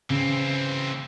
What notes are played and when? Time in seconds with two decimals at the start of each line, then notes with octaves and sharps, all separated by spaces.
0.10 C#3 E3 C4